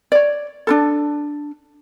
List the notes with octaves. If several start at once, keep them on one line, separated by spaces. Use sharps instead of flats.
C#5 D5
D4 D#4 A4